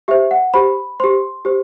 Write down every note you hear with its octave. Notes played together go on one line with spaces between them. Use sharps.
G4 C5 E5
F#5
G4 C5 B5
G4 C5 C6
G4 C5